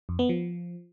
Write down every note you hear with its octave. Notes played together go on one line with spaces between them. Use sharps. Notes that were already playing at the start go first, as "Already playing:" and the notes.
F2
B3
F3